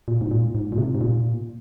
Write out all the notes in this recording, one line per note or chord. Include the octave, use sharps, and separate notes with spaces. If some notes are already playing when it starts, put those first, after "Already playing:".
A#2
G#2
A#2
G#2
A#2
C3
G#2
A#2